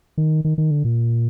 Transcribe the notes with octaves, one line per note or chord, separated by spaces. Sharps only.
D#3
D#3
D#3
D3
A#2